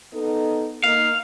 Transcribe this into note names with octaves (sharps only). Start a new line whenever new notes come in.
B3 D#4 A4
A#3 D#4 F5